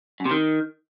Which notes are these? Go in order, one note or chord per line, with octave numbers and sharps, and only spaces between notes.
F#2
C3
D#3